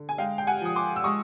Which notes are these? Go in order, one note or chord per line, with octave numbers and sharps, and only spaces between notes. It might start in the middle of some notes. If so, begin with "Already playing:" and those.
Already playing: D3
G#5
G#3 F5 G5
G5
F#5 G#5
F3 D#6
C6 D6
E6
G#3 C#6 D#6